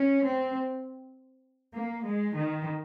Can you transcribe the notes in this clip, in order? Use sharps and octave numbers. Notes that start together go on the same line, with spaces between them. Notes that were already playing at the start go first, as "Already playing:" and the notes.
Already playing: C#4
C4
A#3
G#3
D#3